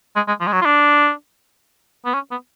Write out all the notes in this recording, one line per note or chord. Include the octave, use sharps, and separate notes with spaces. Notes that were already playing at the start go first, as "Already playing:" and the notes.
G#3
G#3
F3
G#3
F#3
F4
D4
B3
C#4
B3